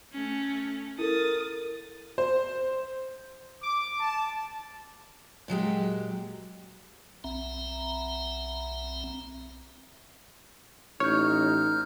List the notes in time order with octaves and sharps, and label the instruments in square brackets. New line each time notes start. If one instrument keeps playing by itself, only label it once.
[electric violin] A3 C#4
[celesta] E4 A4 [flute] A#4 [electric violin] D#6 A6
[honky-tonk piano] C5
[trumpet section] D6
A5
[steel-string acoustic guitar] A#2 F#3 G#3 G4
[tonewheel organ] B1 C4 E5 A#5
[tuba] A1 [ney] D#4 [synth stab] C#5 [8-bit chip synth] F6 G6